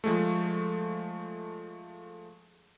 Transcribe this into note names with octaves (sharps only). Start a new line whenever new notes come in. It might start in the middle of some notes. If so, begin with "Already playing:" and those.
F3 G#3 A3